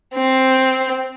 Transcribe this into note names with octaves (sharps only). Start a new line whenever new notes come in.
C4